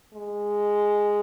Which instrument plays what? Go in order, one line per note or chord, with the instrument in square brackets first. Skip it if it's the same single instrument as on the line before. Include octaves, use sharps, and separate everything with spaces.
[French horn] G#3